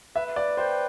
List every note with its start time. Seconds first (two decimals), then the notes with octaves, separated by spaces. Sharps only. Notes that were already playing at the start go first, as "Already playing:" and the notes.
0.16 B4 E5
0.36 D5
0.57 C5 G5